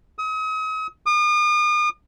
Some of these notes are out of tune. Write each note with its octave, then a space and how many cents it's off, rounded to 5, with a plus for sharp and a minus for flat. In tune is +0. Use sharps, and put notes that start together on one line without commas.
D#6 +40
D#6 -40